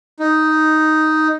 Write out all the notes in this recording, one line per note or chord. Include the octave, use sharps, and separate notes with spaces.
D#4